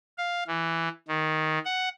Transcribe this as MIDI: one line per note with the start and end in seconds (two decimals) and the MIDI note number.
0.18 0.44 77
0.47 0.89 52
1.08 1.58 51
1.65 1.89 78